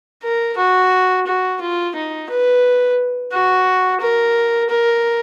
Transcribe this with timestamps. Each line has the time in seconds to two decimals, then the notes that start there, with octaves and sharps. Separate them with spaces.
0.23 A#4
0.57 F#4
1.27 F#4
1.61 F4
1.95 D#4
2.30 B4
3.32 F#4
4.01 A#4
4.70 A#4